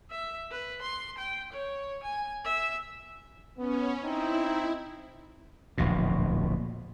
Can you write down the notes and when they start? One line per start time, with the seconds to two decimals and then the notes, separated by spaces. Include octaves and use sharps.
0.11 E5
0.51 B4
0.82 C6
1.18 G5
1.53 C#5
2.04 G#5
2.45 E5
3.57 B3 C#4
4.02 C4 D#4 E4
5.78 D1 A#1 E2 B2